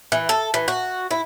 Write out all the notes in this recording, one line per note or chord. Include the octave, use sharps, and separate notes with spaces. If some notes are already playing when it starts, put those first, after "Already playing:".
E3
A4
E3
F#4
E4